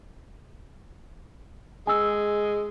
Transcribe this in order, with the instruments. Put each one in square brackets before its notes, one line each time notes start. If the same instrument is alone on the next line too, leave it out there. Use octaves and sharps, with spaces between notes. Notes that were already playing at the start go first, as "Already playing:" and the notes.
[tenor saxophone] G#3 [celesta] G#5 E6